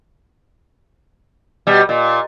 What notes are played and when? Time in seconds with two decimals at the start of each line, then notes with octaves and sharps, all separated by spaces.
1.67 B2 G3
1.89 A#2